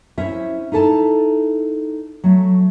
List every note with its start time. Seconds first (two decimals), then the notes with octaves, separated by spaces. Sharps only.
0.18 C#4 E4 C5 E5
0.72 D#4 E4 A4 A5
2.24 F#3 A3